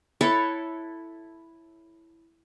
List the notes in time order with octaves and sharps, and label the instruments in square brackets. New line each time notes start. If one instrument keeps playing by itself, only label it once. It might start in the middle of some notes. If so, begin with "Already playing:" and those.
[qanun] E4 A4 B4 C#5